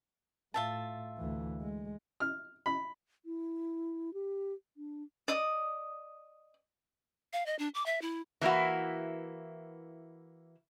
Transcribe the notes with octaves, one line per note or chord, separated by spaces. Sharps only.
A2 F4 E5 A5
D2 E3
G#3
F6
B5
E4
G4
D4
D5 D#5 D#6
F5
D#5
D4
D6
E5
E4
E3 A#3 E4 F#4